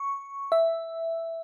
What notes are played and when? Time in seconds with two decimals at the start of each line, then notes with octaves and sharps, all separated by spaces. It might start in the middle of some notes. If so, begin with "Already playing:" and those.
Already playing: C#6
0.52 E5